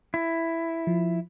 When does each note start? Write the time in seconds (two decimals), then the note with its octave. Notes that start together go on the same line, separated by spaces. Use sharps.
0.14 E4
0.87 F3